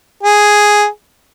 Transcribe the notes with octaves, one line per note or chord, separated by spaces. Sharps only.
G#4